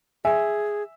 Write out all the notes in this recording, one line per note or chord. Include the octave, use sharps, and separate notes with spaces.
G#4 E5 G#5